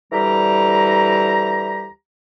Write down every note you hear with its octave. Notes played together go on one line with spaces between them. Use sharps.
D2 E3 G3 G4 A#5